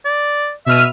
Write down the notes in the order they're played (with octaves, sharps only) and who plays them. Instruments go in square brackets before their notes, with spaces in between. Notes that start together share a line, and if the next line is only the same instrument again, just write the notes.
[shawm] D5
[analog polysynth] B2 F6 D#7 [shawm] E5